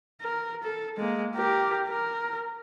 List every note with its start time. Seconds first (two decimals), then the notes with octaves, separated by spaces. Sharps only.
0.21 A#4
0.63 A4
0.98 G#3 A#3
1.35 G4 A#4
1.88 A#4